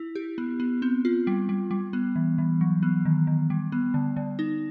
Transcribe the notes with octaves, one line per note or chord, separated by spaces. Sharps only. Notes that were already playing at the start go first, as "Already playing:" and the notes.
Already playing: E4
G4
B3
B3
C4
F4
G3
G3
G3
B3
E3
E3
F#3
B3
D#3
D#3
G3
B3
D3
D3
D#4